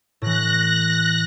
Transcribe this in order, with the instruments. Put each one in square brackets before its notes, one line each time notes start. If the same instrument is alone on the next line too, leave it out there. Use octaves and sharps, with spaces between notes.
[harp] A2 E3 [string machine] F#6 A#6